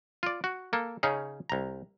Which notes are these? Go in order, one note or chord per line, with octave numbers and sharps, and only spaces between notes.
F4 D5
F#4
A#3 A4
C#3 C#4 D#4 G#4
C2 A#5